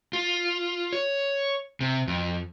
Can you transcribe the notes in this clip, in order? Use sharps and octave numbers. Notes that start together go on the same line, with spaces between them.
F4
C#5
C3
F2